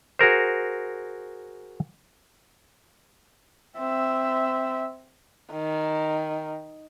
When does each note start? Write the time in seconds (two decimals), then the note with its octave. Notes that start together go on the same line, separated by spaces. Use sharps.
0.19 F#4 G#4 A#4 C5
3.77 C4 E5
5.52 D#3